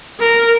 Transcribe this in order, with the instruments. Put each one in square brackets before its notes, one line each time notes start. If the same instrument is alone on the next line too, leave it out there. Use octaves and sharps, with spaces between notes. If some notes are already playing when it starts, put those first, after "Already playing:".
[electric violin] A#4